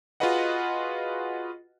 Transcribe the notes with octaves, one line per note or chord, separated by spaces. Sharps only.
F4 F#4 G#4 B4 D#5 F#5